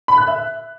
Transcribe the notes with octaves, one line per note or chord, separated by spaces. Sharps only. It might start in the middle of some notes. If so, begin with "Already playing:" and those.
B5
F#6
E5